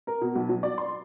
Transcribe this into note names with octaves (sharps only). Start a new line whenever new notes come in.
A#4
B2
B1
F#3
D5
C6